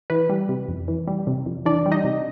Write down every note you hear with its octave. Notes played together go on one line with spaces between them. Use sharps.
E3 B4
G3
C3
F2
E3
G3
C3
F2
E3 D4 D5
G3
D#4 D#5
C3